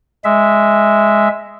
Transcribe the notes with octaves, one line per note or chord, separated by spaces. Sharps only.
G#3 E5